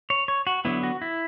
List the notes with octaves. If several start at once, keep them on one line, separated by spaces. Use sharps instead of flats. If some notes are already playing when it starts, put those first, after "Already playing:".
C#5
C#5
F#4
D3 F#3 B3 E4
F#4
E4